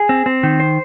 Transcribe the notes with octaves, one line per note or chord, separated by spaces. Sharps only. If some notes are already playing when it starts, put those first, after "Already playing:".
Already playing: G#4
C4
C4
D#3
C5